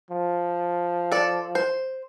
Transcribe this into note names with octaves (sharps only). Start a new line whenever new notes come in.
F3
A4 D5
C5